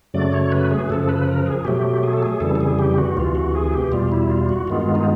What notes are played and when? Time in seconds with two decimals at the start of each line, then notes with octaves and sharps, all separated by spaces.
0.14 F#2 C#3 F#3 A3 D5
0.33 C#5
0.52 B4
0.71 G#4
0.90 F#2 C#3 F3 A4
1.09 B4
1.27 A#4
1.46 G#4
1.65 B2 F#3 A3 G4
2.03 G#4
2.13 A4
2.23 G#4
2.40 F2 C#3 E3 G3 A4
2.55 A4
2.61 G#4
2.79 G4
2.98 F#4
3.17 D2 C3 E3 F4
3.35 F#4
3.55 G#4
3.74 G4
3.92 E2 B2 G3 F4
4.12 E4
4.30 F4
4.49 F#4
4.67 G2 D#3 G#3 B3 F4
4.95 D#4